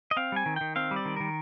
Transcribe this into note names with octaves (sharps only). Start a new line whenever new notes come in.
D#5
C4 F5
G3 G#5
D#3
D#3 G5
C4 F5
G3
D5
D#3
D#3 A#4